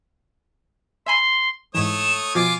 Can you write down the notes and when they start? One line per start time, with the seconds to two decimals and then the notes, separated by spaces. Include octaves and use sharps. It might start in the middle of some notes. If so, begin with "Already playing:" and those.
1.06 E5 G#5 B5 C6
1.75 G#2 E3 A3 C#5 D#6 E7
2.35 B2 F3 F4 G#5 D6 A6